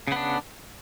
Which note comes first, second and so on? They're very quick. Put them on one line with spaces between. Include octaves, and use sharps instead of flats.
C#3 B3 D4